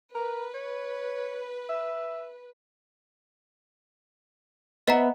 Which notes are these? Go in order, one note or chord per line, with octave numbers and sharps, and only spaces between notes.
A#4 B4
C#5
E5
B3 B4 D#5 E5 F#5 A#5